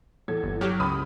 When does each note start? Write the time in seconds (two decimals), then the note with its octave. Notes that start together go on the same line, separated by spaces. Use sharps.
0.28 E2 A4 G#6
0.43 G1
0.61 F#3 G4 F6
0.80 C#2 B5 D#6